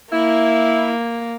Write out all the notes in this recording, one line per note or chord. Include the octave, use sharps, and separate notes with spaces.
A#3 E4